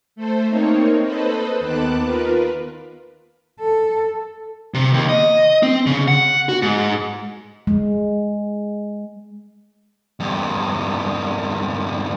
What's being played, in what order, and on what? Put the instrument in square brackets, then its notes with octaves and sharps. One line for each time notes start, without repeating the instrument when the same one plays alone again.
[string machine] A3 A4 C5
A#3 C4 D#4 C#5
A4 B4 C5 D#5 B5
D#2 D#3 B3 A5 D6 F#6
F4 A#4 B4
[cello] A4
[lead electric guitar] C3
D#2
D#5
C4
C#3
F#5
F#4
G#2
[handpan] G#3
[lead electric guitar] E2 G2